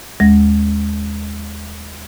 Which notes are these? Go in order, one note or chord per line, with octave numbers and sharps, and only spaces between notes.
D#2 G#3 A#6